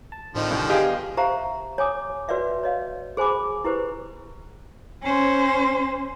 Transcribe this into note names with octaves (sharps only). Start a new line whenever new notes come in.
A5
A1 D3 D#3 F3 C4 D#4
C2
G3 B3 G4 G#4 D#5 F5 G5
G4 C5 E5 F5 A#5
C#5 G#5 D6 D#6
F#4 B4 C#5 D5 E5 F#5
C#5 D#5 F5
G#4 C5 G#5 B5 D6
E4 G4 B4 C5
C#4 C5